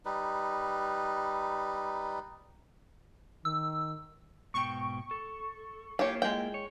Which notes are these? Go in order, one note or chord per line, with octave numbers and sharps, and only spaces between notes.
G3 D#4 B4
D#3 E6
G#2 B2 G5 C#6
A4
A#3 E4 F4 G4 C#5
G#3 G5
C#5